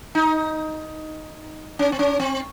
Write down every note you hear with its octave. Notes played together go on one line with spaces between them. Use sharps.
D#4
C#4
C4
C#4
C4